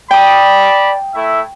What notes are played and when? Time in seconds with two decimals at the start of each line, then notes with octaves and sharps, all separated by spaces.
0.11 D5 G5 A5 B5 D#6
1.14 A3 E4 E5